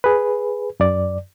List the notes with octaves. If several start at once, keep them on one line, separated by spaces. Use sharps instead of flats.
G#4 B4
F#2 D5